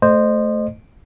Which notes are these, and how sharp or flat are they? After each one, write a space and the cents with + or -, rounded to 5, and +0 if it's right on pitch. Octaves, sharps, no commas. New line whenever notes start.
A3 +0 C5 +0 D#5 -25